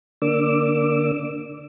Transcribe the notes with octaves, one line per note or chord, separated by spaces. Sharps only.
D3 A#3 D4 D6 E6